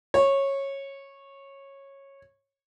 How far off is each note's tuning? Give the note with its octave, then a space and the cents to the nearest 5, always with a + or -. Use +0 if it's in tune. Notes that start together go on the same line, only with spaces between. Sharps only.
C#5 -15